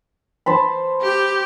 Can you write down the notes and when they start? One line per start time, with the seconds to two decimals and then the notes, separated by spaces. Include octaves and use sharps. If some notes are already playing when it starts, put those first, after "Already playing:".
0.46 C5 A5 B5
1.02 G4